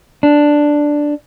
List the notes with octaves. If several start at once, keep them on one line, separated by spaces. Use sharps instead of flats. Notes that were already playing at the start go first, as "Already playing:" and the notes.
D4